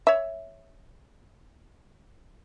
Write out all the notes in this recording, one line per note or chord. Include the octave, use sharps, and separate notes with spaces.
C#5 E5